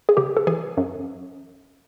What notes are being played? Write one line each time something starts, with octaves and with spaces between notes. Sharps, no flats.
G#4
C#3 G4
A4
E3 G#4
F#2